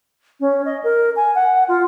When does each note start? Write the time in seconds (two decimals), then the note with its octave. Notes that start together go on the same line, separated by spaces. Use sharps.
0.40 C#4
0.65 D#5
0.84 A#4
1.16 G#5
1.35 F#5
1.68 F4